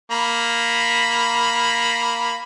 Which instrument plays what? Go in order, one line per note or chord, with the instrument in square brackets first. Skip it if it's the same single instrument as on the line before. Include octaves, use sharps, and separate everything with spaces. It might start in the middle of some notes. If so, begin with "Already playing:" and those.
[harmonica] A#3 B5